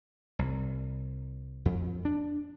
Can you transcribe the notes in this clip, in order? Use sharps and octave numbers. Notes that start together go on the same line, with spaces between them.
C2
F2
D4